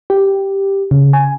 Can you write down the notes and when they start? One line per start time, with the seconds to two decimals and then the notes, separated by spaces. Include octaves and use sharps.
0.10 G4
0.91 C#3
1.13 G#5